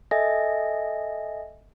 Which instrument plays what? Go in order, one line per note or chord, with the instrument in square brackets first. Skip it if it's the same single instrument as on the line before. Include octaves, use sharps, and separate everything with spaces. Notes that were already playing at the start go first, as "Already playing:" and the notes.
[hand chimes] A4 D#5 E5 G#5 A#6